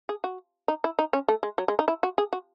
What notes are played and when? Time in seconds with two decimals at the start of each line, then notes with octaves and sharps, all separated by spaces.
0.09 G#4
0.24 F#4
0.68 D#4
0.84 E4
0.99 D#4
1.13 C#4
1.28 A3
1.43 G#3
1.58 F#3
1.68 G#3
1.79 D#4
1.88 E4
2.03 F#4
2.18 G#4
2.33 F#4